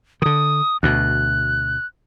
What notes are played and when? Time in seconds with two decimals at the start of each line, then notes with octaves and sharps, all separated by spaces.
0.22 D3 D#3 D#6
0.83 D2 B2 F#6